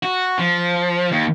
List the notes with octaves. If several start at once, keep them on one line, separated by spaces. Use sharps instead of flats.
F#4
F3
D#2